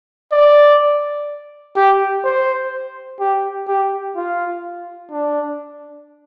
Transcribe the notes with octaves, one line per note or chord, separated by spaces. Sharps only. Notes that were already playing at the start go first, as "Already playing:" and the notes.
D5
G4
C5
G4
G4
F4
D4